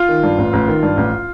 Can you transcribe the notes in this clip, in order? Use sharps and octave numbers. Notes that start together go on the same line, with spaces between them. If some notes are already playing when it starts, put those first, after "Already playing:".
Already playing: F4
D#3
G2
A1
A1
D#3
G2
A1